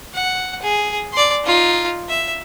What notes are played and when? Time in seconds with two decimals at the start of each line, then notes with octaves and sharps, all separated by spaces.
0.13 F#5
0.62 G#4
1.13 D5 C6
1.45 D#4 F4
2.09 E5